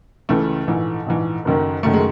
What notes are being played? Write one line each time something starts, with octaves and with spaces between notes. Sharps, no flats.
C#2 C#3 E3 A3
A#1 G#2 E3
A#1 G#2 E3
F#1 F#2 D#3
F#1 F#2 D#3 A3
G#3